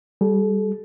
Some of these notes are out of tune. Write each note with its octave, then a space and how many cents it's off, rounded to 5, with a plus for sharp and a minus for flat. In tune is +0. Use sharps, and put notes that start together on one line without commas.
G3 +0 A4 -35